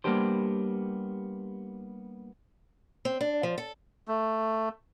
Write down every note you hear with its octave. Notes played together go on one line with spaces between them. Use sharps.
G3 A#3 B3 D4 G4 C5
C4
D4
F3
A4
A3